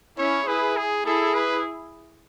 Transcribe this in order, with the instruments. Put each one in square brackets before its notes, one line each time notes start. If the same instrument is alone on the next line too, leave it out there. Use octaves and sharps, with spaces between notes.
[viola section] C#4 E4 [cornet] C#5
[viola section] E4 G#4 [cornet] B4
[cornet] G#4
[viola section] E4 G#4 [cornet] A4
[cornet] B4